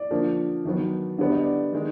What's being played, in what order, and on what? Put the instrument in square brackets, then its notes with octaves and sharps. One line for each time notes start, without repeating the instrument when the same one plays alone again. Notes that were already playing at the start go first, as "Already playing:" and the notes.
Already playing: [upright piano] D5
D3 F3 A#3
D#3 F#3 B3
D3 G3 B3 D5
D#5
D5
D#3 G#3